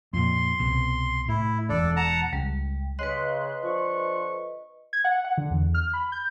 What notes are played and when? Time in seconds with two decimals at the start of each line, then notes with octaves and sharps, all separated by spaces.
0.13 F2 A#2 C6
0.59 C2 B2
1.29 A2 E4
1.69 E1 E2 D4 A4 D5
1.96 F#5 A5 A#5
2.33 C#2 G3
2.99 C#3 B4 D#5 C6 F#6
3.63 D3 F3 C#6
4.93 G#6
5.04 F#5
5.25 F#5
5.37 D3
5.51 E2
5.74 F6
5.93 B5
6.12 G6